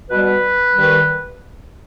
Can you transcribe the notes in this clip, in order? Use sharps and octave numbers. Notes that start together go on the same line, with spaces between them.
B2 G3 B4
G2 D#3 G3